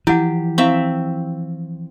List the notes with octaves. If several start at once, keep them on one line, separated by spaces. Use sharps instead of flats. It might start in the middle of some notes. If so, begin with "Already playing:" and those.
E3 F3 E4 G4 F#5
C4 E4 E5 F5 C#6